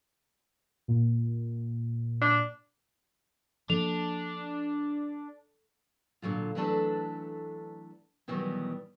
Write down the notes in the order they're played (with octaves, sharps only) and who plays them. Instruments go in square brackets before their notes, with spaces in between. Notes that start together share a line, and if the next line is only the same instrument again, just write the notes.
[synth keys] A#2
[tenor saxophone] D4
[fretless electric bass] F3 A#3 [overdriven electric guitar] D4 [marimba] A4 [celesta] F7
[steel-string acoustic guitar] A#2 D3 F#3 F4
E3 F#3 A3 D4 A4 B4
B2 D#3 E3 F#3 G3 B3